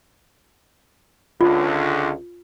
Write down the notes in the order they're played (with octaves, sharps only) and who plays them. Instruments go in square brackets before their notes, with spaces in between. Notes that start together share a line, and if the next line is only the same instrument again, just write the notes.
[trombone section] C#2 D3 [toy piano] F4